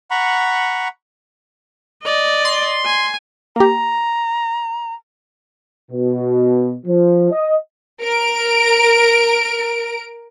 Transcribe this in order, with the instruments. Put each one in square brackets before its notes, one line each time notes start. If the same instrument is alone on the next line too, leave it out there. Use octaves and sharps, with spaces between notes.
[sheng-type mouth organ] F#5 A#5 B5 C#6
[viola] D5 D#5
[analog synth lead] C6
[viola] G#5
[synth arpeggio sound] A#3 G4 [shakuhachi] A#5
[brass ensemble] B2
F3
D#5
[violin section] A#4 D7